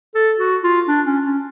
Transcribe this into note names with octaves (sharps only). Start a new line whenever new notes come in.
A4
F#4
F4
D4
C#4
C#4